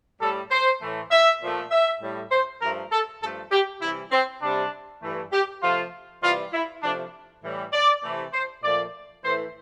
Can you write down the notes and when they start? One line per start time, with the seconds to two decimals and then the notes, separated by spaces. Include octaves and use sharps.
0.21 A2 G3 A4
0.51 C5
0.81 A2 E3 A3
1.11 E5
1.41 A#2 F3 A3
1.71 E5
2.01 A2 G3
2.31 C5
2.62 G2 F3 A3 A#4
2.92 A4
3.22 G2 F3 A3 A4
3.51 G4
3.82 C3 E3 G3 E4
4.12 C4
4.42 C3 G3 D4
5.02 G2 E3 A3
5.32 G4
5.63 C3 F3 A3 F4
6.22 C3 E3 G3 F4
6.53 E4
6.83 C3 F3 A3 D4
7.43 A2 E3 G3
7.73 D5
8.03 C3 E3 A3
8.33 C5
8.63 A#2 F3 A3 D5
9.24 A2 E3 A3 C5